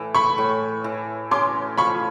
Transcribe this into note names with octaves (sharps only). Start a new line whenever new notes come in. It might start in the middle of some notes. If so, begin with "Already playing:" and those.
Already playing: A2 E3
B5 C#6
A2
E3
C#4 C6 D6
F3 B5 C#6